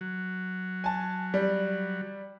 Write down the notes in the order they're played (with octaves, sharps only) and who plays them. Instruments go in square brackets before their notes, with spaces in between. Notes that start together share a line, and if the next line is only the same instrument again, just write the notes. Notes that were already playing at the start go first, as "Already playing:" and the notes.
[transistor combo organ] F#3
[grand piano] G#5 A5
G3